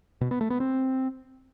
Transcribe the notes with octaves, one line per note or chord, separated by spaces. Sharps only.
B2
B3
A3
B3
C4